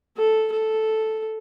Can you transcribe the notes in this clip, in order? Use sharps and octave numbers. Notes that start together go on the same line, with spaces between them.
A4
A4